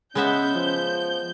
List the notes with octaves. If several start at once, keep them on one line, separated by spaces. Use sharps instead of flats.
C#3 G#3 B3 C#4 E5 G6
F3